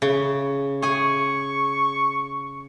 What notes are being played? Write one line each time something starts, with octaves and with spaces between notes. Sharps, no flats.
C#3
G#4 G#5 C#6